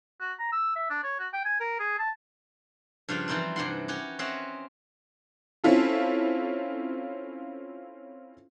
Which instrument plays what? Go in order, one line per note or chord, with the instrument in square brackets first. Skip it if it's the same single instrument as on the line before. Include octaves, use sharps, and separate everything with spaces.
[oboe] F#4
A#5
E6
E5
D4
C#5
F#4
G5
G#5
A#4
G#4
A5
[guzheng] G2 C#3 F3 D4 F4
E3 F3 G3 C4 D#4 E4
G2 C3 E4 F#5 C6
C#4 F#4 G4 C#5
C4 C#4 C#5 D#5 E5 F#5
[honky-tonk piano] C4 C#4 E4 F4 A4